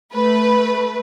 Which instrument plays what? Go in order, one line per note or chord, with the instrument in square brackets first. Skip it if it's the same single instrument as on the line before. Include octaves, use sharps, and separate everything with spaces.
[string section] A3 B4